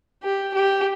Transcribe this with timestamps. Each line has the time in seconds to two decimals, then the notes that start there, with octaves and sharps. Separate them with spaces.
0.24 G4
0.54 G4